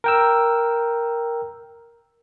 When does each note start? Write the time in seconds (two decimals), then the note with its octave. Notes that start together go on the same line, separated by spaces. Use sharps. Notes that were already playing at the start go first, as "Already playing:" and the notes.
0.04 A#4 G5 E6